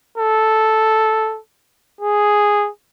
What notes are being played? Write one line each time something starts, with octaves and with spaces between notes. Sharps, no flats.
A4
G#4